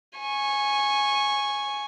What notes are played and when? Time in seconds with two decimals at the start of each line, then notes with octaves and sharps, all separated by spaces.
0.19 G#5 C#6